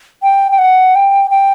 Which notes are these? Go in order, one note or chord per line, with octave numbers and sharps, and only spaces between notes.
G5
G5
F#5
G5
G5